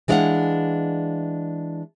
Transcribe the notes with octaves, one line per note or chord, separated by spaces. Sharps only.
E3 G#3 D4 C#5 F5 F#5